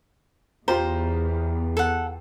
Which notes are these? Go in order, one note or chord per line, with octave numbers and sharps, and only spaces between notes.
E2 F4 G4 C5 A#5
A4 F#5